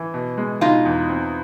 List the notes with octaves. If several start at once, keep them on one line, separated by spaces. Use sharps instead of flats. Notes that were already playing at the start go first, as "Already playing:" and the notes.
Already playing: E3
B2
G#3
B2 D#4 F4
E2
C4